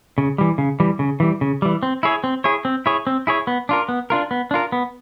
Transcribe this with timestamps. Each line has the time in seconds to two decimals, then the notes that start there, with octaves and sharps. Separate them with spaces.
0.18 C#3
0.38 E3 G3
0.58 C#3
0.80 E3 G3
0.99 C#3
1.20 E3 G3
1.41 C#3
1.62 E3 G3
1.83 C4
2.03 E4 G#4 C#5
2.24 C4
2.44 E4 G#4 C#5
2.65 C4
2.86 E4 G#4 C#5
3.07 C4
3.27 E4 G#4 C#5
3.47 B3
3.69 D4 F4 A#4
3.89 B3
4.10 D4 F4 A#4
4.31 B3
4.51 D4 F4 A#4
4.72 B3